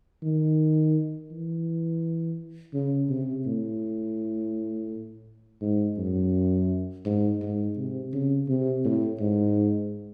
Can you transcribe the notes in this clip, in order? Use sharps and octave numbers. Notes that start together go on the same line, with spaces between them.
D#3
E3
C#3
C3
A2
G#2
F#2
G#2
G#2
C3
C#3
C3
A2
G#2